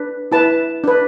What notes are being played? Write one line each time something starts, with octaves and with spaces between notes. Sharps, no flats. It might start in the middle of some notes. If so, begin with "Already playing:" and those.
Already playing: D4 B4
E4 B4 A5
D4 B4